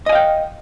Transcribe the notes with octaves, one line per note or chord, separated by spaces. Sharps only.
D#5 F5 G5 G#5